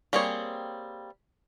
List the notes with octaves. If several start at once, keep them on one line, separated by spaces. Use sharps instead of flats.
G3 A#3 C4 G#4 C#5